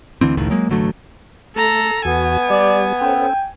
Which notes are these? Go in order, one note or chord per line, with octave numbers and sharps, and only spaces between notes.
D2 D3 E3 C4
F1 C#2 A2 D#3
F#3 G#3 A#3
A1 D3 F#3 A3
A3 A4 A#5
E2 B3 F#4 G#5
G3 D5
C#4 A4 C5 G5